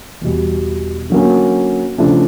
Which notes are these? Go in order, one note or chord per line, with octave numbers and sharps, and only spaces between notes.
E2 B2 G3
D3 F#3 A#3 C#4
C#3 F3 A3 D4